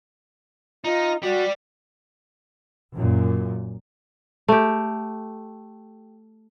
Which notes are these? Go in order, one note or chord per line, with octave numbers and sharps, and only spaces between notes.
D#4 F4
G3 F#4 D5
F#2 A#2
A3 G4